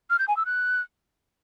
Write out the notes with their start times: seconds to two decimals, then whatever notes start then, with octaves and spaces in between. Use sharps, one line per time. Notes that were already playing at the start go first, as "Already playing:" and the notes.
0.10 F6
0.19 G6
0.28 G#5
0.37 E6
0.46 F#6